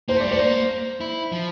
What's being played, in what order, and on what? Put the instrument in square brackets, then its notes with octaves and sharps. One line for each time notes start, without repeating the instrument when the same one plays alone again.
[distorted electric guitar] A#3 [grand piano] C5
[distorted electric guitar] A3
[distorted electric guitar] G3 [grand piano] D5
[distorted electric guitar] A3 [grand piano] C5
[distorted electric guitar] A#3
E4
F3